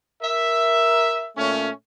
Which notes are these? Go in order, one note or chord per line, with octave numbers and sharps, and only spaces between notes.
A#4 E5
A#2 A3 C#4